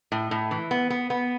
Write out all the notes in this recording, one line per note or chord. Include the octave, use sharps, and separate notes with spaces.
A2
A2
E3
B3
B3
B3